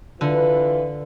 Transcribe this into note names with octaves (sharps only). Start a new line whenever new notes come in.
D3 E3 F4 B4